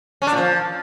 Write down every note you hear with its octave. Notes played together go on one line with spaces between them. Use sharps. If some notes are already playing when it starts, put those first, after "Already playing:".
C#4
D4
A#2
F3